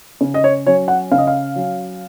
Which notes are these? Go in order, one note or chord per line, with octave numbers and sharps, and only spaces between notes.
C#3
D#5
C#5
F#3 C#4 C#5
F#5
C#3 F5
D#5
F5
F#3 C#4